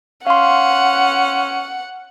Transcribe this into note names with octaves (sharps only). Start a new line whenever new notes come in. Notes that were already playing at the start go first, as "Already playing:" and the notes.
C#4 F5 F#5 C6